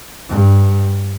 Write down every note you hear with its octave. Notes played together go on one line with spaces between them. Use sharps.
G2